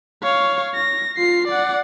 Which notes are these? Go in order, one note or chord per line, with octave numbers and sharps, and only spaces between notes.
C#5 F5
A#6
F4 C7
D5 F#5